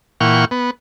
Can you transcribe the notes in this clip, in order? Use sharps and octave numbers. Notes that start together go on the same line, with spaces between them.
A#2 E3 F#5 G5 C#6 F6
B3